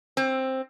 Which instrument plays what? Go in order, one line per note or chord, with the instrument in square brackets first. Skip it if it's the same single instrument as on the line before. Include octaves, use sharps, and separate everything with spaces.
[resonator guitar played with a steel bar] C4